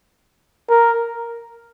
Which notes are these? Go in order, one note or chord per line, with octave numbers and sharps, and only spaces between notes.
A#4